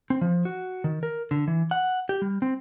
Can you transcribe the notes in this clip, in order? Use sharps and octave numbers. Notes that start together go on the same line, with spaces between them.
C4
F3
F#4
D#3
A#4
D3
E3
F#5
G4
G3
C4